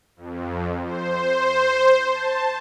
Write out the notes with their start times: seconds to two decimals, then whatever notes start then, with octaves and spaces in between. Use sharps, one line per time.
0.16 F2
0.85 C5
2.11 A5